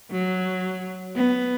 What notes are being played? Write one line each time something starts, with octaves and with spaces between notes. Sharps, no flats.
F#3
B3